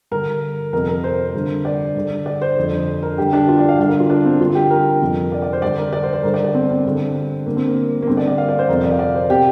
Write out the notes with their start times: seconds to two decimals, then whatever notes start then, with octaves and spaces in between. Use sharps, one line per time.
0.11 G2 D3 A#4
0.73 F2 C3 A#4
0.88 A#4
1.04 C5
1.34 G2 D3
1.65 D5
1.95 G2 D3
2.26 D5
2.42 C5
2.57 F2 D3
3.03 A#4
3.18 G2 D3 G4
3.33 D4
3.48 F4
3.59 D5
3.69 F5
3.79 G2 D3 F5
3.89 A#4
4.00 F4
4.10 D4
4.25 C4
4.40 G2 D3 F4
4.55 G4
4.71 A#4
5.01 F2 C3
5.32 D5
5.42 D5
5.53 C5
5.62 G2 D3 D5
5.78 A#4
5.93 D5
6.03 C5
6.13 C5
6.23 G2 D3 A#4
6.34 D5
6.44 D5
6.54 C4
6.70 C4
6.85 G2 D3
7.46 G2 A#3
7.49 D3
7.56 C4
7.66 A#3
8.02 A#3
8.07 G2 D3 C4
8.17 D5
8.28 D5
8.38 F5
8.49 D5
8.59 C5
8.69 F2 C3 A#4
8.84 D5
8.92 F5
8.99 D5
9.15 C5
9.29 C3 G4